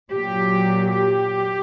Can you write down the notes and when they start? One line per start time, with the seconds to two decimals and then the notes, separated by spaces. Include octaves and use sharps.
0.12 A#2 F#3 G4
0.93 G4